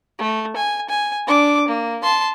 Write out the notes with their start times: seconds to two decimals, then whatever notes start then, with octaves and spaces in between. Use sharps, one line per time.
0.19 A3
0.56 G#5
0.89 G#5
1.27 D4 D6
1.68 A#3
2.03 A5 C6